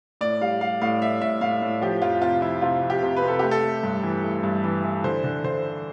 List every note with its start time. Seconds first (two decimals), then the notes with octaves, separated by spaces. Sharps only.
0.21 A2 D5
0.41 G3 F5
0.61 G3 F5
0.81 A2 F5
1.02 A2 E5
1.21 A2 E5
1.41 A2 F5
1.62 A2
1.82 F3 G4
2.02 F2 F4
2.22 C3 F4
2.42 F3 E4
2.62 C3 F4
2.83 F2
2.90 G4
3.03 C3
3.17 B4
3.22 C3
3.28 A4
3.39 A3 G4
3.51 A4
3.63 A3
3.83 G2
4.03 E3
4.24 A3
4.43 G2
4.64 E3
4.84 E3
5.04 D3 C5
5.24 D3
5.44 D3 C5